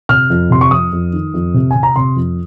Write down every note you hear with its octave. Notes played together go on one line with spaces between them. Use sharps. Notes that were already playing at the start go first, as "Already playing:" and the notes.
C3 F6
F2
C3 C6
C#6
F2 D#6
F2
D#3
F2
C3
C3 G#5
A#5
C3 C6
F2